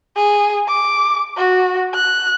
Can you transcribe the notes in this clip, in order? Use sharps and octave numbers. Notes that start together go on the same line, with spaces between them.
G#4
D6
F#4
F#6